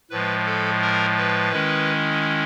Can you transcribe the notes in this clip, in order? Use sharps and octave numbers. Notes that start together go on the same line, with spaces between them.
A2 F3 G#3 B4
A4
A#4
B4
D#3 G#3 C#4 E4